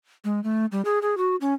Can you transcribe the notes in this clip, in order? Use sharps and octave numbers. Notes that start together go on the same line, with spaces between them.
G#3
A3
G3
G#4
G#4
F#4
C#4